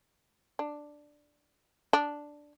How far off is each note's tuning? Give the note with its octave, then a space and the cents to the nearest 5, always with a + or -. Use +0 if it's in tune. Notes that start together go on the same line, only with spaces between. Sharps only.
D4 +5
D4 +0